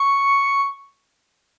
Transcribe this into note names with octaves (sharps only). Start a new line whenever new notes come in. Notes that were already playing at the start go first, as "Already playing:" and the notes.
Already playing: C#6